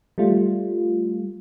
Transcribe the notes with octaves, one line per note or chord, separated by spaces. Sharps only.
G3 A3 F4